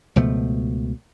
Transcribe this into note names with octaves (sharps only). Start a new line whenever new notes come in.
C#2 B2 F3 A3